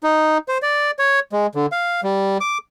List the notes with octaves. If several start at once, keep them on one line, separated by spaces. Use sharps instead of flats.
D#4
C5
D5
C#5
G#3
D3
F5
G3
D6